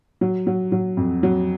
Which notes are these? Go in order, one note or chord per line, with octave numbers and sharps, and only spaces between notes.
F#3
F#3
F#3
F2
F#3